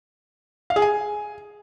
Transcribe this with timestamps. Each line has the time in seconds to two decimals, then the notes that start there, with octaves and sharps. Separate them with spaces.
0.70 F5
0.76 G#4
0.82 G#5